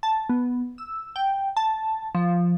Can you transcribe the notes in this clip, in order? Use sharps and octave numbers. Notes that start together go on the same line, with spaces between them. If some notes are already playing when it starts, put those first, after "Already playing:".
A5
B3
E6
G5
A5
F3